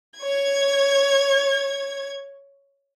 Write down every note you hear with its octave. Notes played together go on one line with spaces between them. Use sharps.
C#5 G#6